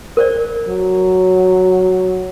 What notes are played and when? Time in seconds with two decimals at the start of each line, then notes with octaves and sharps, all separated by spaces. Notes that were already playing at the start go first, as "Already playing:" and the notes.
0.17 A#4 C5 D5
0.68 F#3